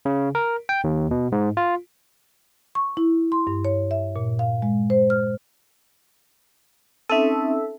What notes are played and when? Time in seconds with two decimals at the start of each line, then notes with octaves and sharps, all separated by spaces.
0.05 C#3
0.35 A#4
0.69 G5
0.84 D#2
1.11 B2
1.32 G#2
1.57 F4
2.75 C#6
2.97 E4
3.32 C6
3.47 G2
3.65 C#5
3.91 E5
4.16 A#2
4.39 F5
4.62 G#3
4.90 C5
5.10 F6
7.09 C4 C#4 D#4 A4 E5